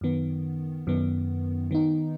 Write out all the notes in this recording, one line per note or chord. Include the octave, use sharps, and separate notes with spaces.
F#2 D#3 B3
F#2 D#3 B3
D#3 B3 D#4